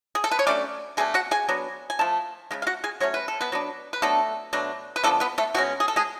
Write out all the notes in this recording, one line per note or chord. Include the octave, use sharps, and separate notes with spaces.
G#4
A4
B4
C#5
F#3 A3 C#4 D4 D5
B2 A3 D4 G#4 G#5
F#4 F#5
G#4 G#5
F#3 B3 D4
G#5
F3 A3 A5
C#3 F3 G#3
F5
F#4 F#5
G#4 G#5
F#3 A3 C#4 C#5
B4
A4
B3 B4
F#3 B3 D4
B4
F#3 A3 B3 D4 A4
B2 F#3 A3 D4
B4
D3 F3 A3 B3 D4 A4
B3 B4
A3 A4
B2 G#3 C#4 F#4
G#4
A4
G#3 G#4